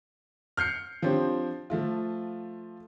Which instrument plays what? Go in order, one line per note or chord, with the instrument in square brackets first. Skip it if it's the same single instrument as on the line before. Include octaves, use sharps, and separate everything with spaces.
[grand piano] F6 G6 C7 C#7
F3 C4 D4 G4 C#5
F3 A3 F4